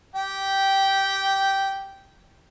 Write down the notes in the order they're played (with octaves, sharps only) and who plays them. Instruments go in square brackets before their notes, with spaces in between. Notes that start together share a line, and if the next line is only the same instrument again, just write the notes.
[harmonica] G4 G5